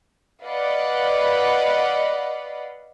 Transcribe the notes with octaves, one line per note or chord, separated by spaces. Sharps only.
B4 D5 D#5 F5 F#5 B5